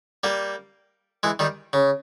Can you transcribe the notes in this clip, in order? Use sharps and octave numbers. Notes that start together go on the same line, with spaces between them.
G3 A#3
E3 G#3
D#3 G3
C#3